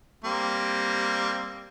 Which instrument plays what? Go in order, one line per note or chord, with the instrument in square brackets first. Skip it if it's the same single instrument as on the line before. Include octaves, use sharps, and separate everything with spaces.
[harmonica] G3 A#3 C4